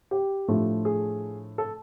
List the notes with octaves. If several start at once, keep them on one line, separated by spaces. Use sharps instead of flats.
G4
A2 F3 A3 D4 F4
G#4
A4